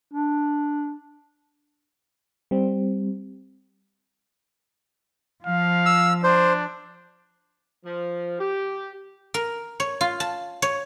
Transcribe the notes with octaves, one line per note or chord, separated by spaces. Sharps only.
D4
G3 C4
F3 F5
E6
D4 C5
F3
G4
A#4
C#5
F4
A5
C#5